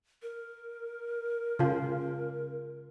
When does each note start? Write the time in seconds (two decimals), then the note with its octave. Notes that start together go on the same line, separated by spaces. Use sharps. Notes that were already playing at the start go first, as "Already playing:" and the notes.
0.22 A#4
1.59 C#3 F4